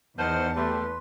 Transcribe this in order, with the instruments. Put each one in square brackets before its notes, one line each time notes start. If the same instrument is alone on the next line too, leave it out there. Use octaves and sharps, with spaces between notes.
[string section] E2 [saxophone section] D#3 B4 C5 [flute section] D#5 F#5 F6 [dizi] A5
[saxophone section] G3 A3 [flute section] B4 C6